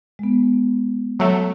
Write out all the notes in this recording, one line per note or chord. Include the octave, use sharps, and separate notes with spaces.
G#3 B3
F#3 A3